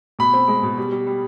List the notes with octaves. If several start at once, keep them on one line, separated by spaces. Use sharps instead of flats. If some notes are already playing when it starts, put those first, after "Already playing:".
B2 B5
C4
G#3
B2
G3
G3
G3